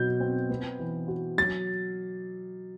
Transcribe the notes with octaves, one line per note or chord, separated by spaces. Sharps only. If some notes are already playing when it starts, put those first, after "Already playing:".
Already playing: B2 F#3 G6
C4
B3
E3
F#4
F#3 A6